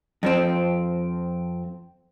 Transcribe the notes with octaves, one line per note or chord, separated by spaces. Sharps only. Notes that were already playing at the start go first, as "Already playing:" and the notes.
F2 F3 C4